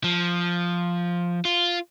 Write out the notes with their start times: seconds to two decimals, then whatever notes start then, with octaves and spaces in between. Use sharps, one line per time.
0.04 F3
1.45 F4